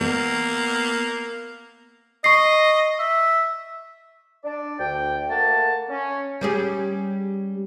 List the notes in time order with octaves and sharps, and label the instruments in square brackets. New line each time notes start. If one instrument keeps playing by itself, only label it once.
[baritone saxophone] A#3 [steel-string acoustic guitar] B3
[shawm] D#5 [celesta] C#6 C7
[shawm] E5
[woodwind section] D4 D5
D2 G5
A3 A#3 F#5 A5
C#4
[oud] G3 C#4 G#4